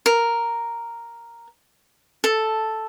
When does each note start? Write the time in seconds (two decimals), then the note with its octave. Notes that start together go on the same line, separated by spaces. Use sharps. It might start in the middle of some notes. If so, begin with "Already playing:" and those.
0.06 A#4
2.24 A4